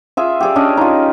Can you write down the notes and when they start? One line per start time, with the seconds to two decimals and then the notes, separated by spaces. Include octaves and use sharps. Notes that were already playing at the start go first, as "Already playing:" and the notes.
0.17 F4 G#4 E5
0.40 G4 G#4 D5
0.56 C#4 D4 C#5 D#5
0.77 D#4 F4